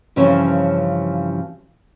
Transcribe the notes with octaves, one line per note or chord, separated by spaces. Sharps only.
G2 C#3 E3 F3 C#4